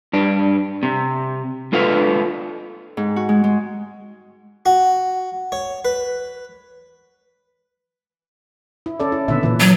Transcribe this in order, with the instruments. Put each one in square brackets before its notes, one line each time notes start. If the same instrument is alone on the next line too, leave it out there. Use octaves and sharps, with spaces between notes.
[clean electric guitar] G2 D4
C3
G#3 F4 A4 B4 F5
[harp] G#2
F#4
G#3
G#3
[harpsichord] F#4
C#5
B4
[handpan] E4
C#4 A4 D5
E4
[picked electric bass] A#2 D3 B3 [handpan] E5
[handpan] A#2 B4 [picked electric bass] E3
[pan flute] F#3